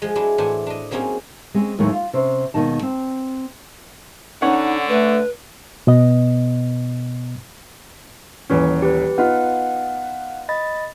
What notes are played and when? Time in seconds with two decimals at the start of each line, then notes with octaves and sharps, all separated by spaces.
0.02 F3 G#3
0.15 F#3 G#3 D4 E4
0.38 A2 E3 D4 C5 F#5 G#5
0.67 D4 D#5
0.91 F#3 A#3 C4 C#4 D#4 G#4
1.54 G#3 C4 C#4
1.79 D#2 A2 D#3 F#3 G#3 C#5
1.93 F4
2.13 C3 C#4 C5
2.54 D#2 B2 D#3 G#3 D#4 A5
2.82 C4
4.42 D3 C#4 D#4 C#5 F#5
4.88 A3 B4
5.87 B2 B3 D#5
8.50 D#1 E3 C#4
8.82 G4 B4
9.18 B3 D#4 F4 F5 F#5
10.49 D#5 B5 A6